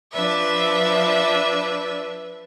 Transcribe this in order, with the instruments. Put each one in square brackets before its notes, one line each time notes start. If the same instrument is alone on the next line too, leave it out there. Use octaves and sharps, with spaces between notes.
[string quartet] F3 D4 B4 E5